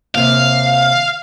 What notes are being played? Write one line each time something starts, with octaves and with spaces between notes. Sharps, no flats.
D#2 C3 F5